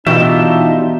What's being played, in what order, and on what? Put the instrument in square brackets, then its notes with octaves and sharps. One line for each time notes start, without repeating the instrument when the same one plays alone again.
[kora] B2 G5 [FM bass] E3 [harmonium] D4 D#4 [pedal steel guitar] F4 G4 E5